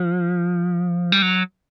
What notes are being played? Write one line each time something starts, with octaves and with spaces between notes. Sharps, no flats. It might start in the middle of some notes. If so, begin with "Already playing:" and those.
Already playing: F3
G3
F#3